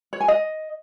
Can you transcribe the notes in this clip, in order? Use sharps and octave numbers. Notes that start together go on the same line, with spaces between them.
C#5
G#5
D#5